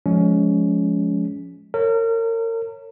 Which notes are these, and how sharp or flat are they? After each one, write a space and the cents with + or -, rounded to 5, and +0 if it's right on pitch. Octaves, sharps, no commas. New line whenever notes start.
F3 +10 G#3 +15 C#4 +25
A#4 -35 C#5 -10